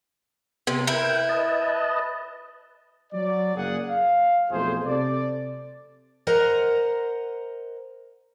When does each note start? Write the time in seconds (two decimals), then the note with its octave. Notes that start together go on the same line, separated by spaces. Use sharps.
0.67 C3 B3 G#5
0.87 E4 A#4 B4 G5
1.29 B4 D#5 A5
3.13 F#3 D5
3.56 F#1 A#3 G#4 F#5
3.87 F5
4.51 B1 F2 A3 F4 G#4 C5
4.85 C3 A4 D5
6.27 A#4 C5 D#5 F#5 A#5